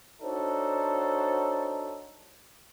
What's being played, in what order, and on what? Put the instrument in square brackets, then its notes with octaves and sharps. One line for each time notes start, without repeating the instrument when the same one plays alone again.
[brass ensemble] D4 D#4 F#4 A4 C5 C#5